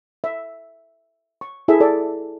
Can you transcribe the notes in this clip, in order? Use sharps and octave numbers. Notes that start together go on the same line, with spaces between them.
E5
C#6
E4 G#4 A4 E5
A4 D5